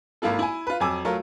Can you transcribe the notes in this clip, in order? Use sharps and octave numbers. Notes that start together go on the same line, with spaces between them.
G#1 A#3 E4 F4 A4
E4 G#5
F4 B4
F2 F#3 G#5 D6 E6
F#3 A3 F4 A#4